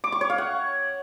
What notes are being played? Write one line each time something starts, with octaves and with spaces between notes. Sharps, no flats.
D6
C#6
C#5
F5
F#5